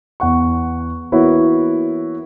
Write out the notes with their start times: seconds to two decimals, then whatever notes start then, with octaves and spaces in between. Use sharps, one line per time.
0.20 E2 F#5 C#6
1.12 E3 A#3 B3 E4 F#4 C#5